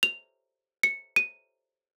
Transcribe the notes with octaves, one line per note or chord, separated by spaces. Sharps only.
F7
C#7
D#7